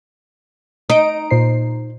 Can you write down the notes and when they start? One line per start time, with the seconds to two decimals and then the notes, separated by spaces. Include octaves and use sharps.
0.90 D#4 D#6 D7
1.31 A#2 C5 C7